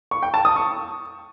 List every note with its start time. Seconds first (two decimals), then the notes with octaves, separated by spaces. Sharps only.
0.11 C#6
0.23 G5
0.34 A5
0.45 D#6
0.56 C#6